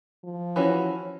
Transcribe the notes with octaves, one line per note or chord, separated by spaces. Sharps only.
F3
E3 C#4 F#4